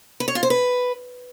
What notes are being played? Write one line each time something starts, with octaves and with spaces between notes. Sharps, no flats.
B4
C#5
F4
C5
B4